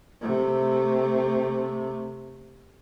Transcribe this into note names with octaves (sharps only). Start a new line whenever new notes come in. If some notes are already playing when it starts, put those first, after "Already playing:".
C3 A3